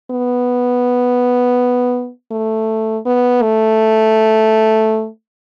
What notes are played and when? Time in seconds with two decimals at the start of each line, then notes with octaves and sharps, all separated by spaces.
0.11 B3
2.32 A3
3.06 B3
3.42 A3